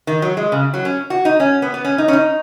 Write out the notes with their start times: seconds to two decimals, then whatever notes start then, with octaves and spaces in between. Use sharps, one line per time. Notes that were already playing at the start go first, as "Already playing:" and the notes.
0.07 D#3
0.22 F#3
0.37 G#3
0.52 C#3
0.74 F#3
0.85 C#4
1.10 F#4
1.25 D#4
1.40 C#4
1.62 B3
1.74 B3
1.85 C#4
1.98 D#4
2.08 C#4
2.13 D#4